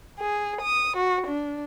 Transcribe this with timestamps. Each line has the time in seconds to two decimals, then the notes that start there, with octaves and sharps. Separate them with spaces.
0.19 G#4
0.62 D#6
0.97 F#4
1.27 D4